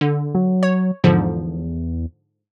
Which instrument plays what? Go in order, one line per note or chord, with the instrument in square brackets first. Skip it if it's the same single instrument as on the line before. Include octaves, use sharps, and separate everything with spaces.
[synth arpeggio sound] D3
[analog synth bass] F#3
[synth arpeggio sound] C#5
[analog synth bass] E2 [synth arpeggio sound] G#2 D3 F3